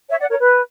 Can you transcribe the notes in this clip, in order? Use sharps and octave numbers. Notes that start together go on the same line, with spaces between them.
C#5 E5
D5 F#5
A#4 C#5
B4